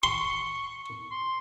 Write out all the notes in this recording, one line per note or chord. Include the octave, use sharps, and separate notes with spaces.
C6 C#6
C6